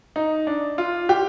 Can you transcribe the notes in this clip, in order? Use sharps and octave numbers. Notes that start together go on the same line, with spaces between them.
D#4
D4
F4
G4